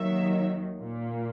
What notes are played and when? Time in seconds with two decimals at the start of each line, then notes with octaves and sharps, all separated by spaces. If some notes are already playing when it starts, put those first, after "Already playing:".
Already playing: D#2 D#3 F#3 E5
0.78 A#2 A#3